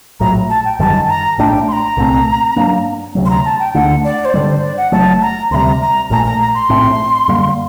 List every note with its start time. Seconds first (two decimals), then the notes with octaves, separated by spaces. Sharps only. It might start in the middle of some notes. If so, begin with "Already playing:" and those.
0.20 A#1 A2 F#3 A#5
0.50 A5
0.65 G5
0.79 G1 F#2 D#3 G3 A5
1.09 A#5
1.38 A#1 A2 A3 D4 G5
1.68 C6
1.73 A#5
1.97 C2 A#2 A3 C4
2.56 G2 F#3 A#3 D4
3.15 D2 C3 F#3
3.26 C6
3.30 A#5
3.45 A5
3.60 G5
3.74 D2 D3 A3 D4 F#5
4.04 D5
4.25 C5
4.34 G2 D3 G3 D5
4.48 C5
4.63 D5
4.77 F#5
4.92 F#1 F#2 F#3 A3 A5
5.22 A#5
5.51 D2 C6
5.54 C3 G3 A#5
5.81 A#5
6.10 A#1 A#2 A3 A#5
6.25 A#5
6.40 A#5
6.54 C6
6.69 A#1 A2 A3 C4
7.28 F#2 D3 G3 A#3